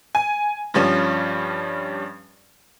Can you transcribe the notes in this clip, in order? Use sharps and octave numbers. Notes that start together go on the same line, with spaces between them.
G#5
G2 F3 G3 C#4